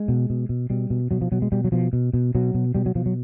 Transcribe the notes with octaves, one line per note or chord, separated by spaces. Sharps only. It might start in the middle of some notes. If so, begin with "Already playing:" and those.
Already playing: G#3
B2
B2
B2
B2 G3
B2
B2 F#3
F3
B2 F#3
G#3
B2 G3
F#3
B2 F3
B2
B2
B2 F#3
B2
B2 G3
F#3
B2 F3
F#3